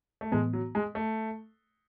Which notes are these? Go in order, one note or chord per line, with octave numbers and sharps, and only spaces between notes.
A3
A2 E3 G#3 B3
F#3
G#3
A3